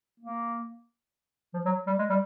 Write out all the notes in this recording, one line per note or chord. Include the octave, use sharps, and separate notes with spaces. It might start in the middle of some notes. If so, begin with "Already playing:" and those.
A#3
F3
F#3
G3
G#3
G3